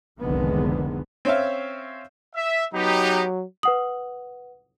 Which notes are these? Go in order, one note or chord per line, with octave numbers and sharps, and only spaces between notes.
F1 C2 D3 D#3 G#3 B3
C4 C#4 C#5 E5 F5
E5
F#3 B3 D#4 G4
B4 F#5 D#6 F#7